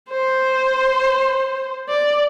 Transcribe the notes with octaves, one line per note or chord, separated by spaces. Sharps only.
C5
D5